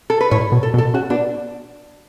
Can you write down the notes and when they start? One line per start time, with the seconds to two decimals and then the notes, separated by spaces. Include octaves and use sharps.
0.10 A4
0.21 B4
0.31 A2 C#5
0.52 B2
0.63 A4
0.74 B2
0.78 A4
0.94 C#3 F#4
1.10 B2 D4